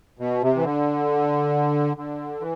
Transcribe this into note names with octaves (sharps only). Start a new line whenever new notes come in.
B2
C3
E3
D3
D3
E3